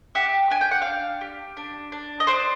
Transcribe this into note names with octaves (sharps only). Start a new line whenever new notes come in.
G4 E5 F#5
D4 G#5
G5
F#5
D4 F5 G5
G4
D4
D4
D#5
D4 C5 D5